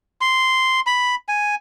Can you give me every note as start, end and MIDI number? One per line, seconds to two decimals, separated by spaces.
0.21 0.80 84
0.87 1.15 83
1.28 1.55 80